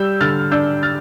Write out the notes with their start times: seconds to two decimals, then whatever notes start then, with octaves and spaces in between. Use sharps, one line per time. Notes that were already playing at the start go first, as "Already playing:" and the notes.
Already playing: G3 E6 G6
0.21 D3 F6 A6
0.51 D4 E6 G6
0.83 F6 A6